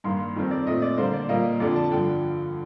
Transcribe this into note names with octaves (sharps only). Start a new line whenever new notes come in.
G2 D#3 A#3 C6
F2 D#3 G3 C4
D5
A#2 A3 C4 D#5
D5
D3 G3 A#3 C5
D5
A#2 G3 A#3 D#5
F2 D3 F3 D5
A5
G2 D3 F3 G5